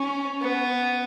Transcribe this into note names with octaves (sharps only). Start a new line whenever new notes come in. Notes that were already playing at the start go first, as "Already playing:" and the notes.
Already playing: C#4
B3